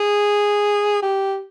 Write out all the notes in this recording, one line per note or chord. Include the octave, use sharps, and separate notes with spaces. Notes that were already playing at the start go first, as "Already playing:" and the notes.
Already playing: G#4
G4